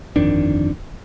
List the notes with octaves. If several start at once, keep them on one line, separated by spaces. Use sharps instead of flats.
G1 F2 D#3 D4